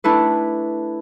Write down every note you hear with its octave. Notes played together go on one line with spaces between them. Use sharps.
A3 D4 E4 A4 B4